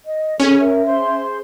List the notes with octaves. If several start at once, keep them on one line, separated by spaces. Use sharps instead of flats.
D#5
C#4 G#4 A4
A#4 E5
G#4 C5 C6